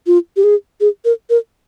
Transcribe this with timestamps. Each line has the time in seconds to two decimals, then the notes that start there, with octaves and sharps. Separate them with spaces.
0.07 F4
0.37 G4
0.44 G#4
0.81 G#4
1.05 A#4
1.30 A#4